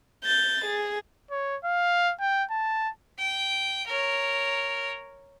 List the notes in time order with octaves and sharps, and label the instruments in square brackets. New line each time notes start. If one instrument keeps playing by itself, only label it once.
[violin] G6 A6
G#4
[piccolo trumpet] C#5
F5
G5
A5
[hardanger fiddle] G5
A#4 C#5